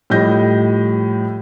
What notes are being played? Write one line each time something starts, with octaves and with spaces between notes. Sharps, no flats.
A2 F3 G3 D#5 G6 A#6